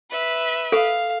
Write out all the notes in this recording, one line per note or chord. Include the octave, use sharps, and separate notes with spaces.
B4 E5
A4 F5